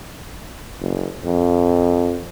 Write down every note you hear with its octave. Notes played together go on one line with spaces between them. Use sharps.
F#1
F2